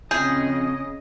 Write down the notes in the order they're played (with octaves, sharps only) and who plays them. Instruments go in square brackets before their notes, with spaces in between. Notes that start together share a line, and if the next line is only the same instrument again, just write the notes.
[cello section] C#3 D#5 [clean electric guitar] C4 F4 A#5 [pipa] G#4 [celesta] G6